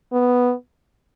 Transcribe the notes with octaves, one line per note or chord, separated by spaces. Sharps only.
B3